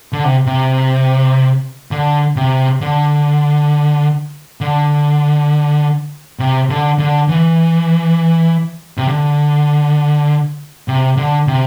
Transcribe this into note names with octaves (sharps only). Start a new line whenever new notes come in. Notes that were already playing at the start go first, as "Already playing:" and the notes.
D3
C3
C3
D3
C3
D3
D3
C3
D3
D3
E3
C3
D3
C3
D3
C3